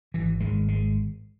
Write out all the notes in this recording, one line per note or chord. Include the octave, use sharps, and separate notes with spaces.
G#1 E3
G#1 G#3
G#3